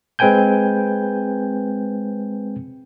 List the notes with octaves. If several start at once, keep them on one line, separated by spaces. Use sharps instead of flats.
G#3 C4 B4 G5 G#5 G6